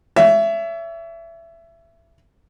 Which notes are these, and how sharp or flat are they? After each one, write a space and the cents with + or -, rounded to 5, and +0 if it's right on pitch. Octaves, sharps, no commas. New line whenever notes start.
C#5 +40 E5 +20